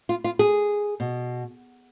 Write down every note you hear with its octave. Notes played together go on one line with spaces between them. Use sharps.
F4
F4
G#4
B2